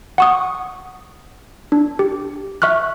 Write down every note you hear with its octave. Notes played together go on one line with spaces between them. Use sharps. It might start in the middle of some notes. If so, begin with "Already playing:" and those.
F#5 C#6 D#6
D4
G4
E5 C#6 F6 F#6